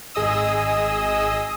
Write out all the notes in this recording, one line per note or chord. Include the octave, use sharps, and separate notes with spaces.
G#1 G#4 D#5 D#6 E6